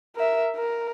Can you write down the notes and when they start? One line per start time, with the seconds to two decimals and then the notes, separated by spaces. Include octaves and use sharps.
0.16 A#4 E5
0.56 A#4